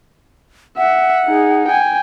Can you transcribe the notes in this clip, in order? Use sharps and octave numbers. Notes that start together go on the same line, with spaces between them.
E5 F#5
D#4 G#4
G5 G#5